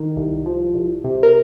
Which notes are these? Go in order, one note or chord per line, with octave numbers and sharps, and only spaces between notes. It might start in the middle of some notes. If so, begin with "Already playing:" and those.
Already playing: D#3
C2
F3
C2
C3
A#4